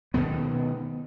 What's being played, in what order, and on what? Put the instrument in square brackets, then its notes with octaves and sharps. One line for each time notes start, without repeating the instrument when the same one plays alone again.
[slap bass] B2 D#3 B3